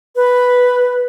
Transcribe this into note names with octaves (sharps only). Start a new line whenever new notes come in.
B4